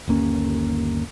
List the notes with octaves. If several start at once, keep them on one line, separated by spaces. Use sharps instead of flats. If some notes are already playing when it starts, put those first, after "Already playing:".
G1 D#2 A#3 C#4